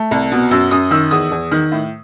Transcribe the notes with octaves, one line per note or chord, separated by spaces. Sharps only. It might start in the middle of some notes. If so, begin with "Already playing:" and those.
Already playing: A3
C2
B2
F#2 E6
F#2 D#6
D#3 E6
E2 D#6
E2
D#3
A2